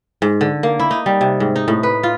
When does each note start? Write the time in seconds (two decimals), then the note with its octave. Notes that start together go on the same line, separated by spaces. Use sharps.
0.22 G#2
0.41 D3
0.63 A#3
0.80 E4
0.91 D#4
1.06 G3
1.21 C3
1.40 G#2
1.56 D#4
1.68 A2
1.83 B4
2.03 F4